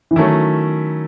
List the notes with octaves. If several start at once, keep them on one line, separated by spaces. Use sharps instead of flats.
E3
D#3 F#3 A3 C#4 E4